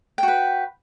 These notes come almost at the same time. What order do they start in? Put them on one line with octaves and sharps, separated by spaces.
G5 F#4 B4